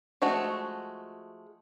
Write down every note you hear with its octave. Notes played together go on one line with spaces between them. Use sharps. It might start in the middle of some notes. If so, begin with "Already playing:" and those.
F3 G#3 A3 F#4